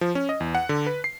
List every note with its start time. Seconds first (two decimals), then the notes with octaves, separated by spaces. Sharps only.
0.01 F3
0.15 C#4
0.29 D#5
0.40 E2
0.55 F#5
0.69 D3
0.86 B4
1.04 C7